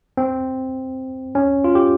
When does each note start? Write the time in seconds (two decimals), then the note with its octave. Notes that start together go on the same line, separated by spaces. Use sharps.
0.17 C4
1.35 C#4
1.64 F4
1.75 G4